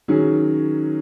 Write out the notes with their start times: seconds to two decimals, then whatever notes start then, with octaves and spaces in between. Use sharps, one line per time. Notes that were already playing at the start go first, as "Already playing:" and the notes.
0.08 D#3 F#3 C#4 G#4